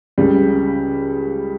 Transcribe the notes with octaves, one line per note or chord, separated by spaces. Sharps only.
C#2 C#3 G3